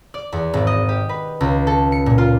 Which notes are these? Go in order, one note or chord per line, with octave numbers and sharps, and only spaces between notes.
D5
E2
G#1
D#5
G4
B4
C#2
A4
C#7
A#2
F4